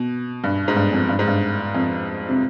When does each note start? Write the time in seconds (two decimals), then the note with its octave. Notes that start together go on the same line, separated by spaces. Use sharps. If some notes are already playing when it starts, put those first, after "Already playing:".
Already playing: B2
0.44 G2
0.68 G#2
0.76 G2
0.93 F2
1.09 G2
1.19 G#2
1.27 G2
1.75 F2
2.29 C3